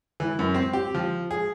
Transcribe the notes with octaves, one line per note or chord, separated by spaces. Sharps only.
E3
F#2
C4
G4
F3
G#4